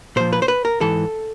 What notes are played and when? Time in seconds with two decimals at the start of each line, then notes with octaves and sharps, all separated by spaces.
0.16 A#2 F3 C5
0.33 B4
0.42 C5
0.48 B4
0.65 A#4
0.81 G#2 E3 A4